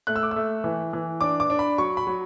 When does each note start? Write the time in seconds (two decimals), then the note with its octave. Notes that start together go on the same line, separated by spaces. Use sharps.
0.07 A3 F#6
0.16 E6
0.23 D6
0.31 A3 E6
0.64 E3
0.93 E3
1.21 D4 D6
1.40 D6
1.50 D4
1.59 B5
1.78 F#3 C#6
1.97 B5
2.07 F#3